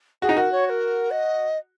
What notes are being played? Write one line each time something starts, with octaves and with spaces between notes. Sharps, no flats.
F#4 G#4
D#4
F#4 A#4
C#5
C#5
A#4
D#5